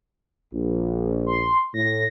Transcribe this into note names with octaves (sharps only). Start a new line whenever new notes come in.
A#1
C6
A2 A#6